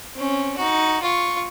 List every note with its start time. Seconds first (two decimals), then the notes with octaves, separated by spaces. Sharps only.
0.15 C4 C#4
0.57 D#4 F#4
1.02 F4 C#6